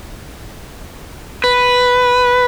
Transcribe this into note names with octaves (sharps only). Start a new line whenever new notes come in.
B4